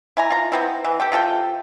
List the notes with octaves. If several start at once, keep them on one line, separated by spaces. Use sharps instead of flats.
E4 G#5 A#5
F4 A#5
B3 C4 E4
E3
G4 A4 G5
C3 F4 A4 G5